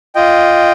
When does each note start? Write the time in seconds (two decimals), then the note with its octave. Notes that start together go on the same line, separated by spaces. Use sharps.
0.15 F4 D#5 G5